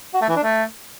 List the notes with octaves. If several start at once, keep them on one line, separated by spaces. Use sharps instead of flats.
F#4
A3
E3
D4
A3